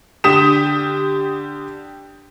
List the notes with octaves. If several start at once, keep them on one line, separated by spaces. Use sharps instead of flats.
D3 G4 D#6 B6 E7